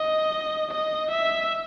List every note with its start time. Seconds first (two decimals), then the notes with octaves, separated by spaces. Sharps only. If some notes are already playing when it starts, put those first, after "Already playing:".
Already playing: D#5
0.71 D#5
1.11 E5